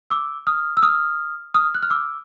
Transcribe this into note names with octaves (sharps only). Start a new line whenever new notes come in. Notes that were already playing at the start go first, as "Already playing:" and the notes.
D6 E6
D#6 F6
E6
D#6 F6
D#6 F6
F#6
F6
D6 E6